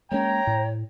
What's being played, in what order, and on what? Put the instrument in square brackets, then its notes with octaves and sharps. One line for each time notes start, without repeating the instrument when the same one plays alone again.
[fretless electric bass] G#3 A#3 C#4 [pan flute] C#5 [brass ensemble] G5 A#5
[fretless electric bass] A2